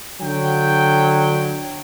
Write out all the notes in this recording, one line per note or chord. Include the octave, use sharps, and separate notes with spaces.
D3 F#3 G5